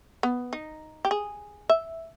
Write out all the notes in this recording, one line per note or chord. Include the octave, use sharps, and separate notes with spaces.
B3
D#4
G4
G#4
E5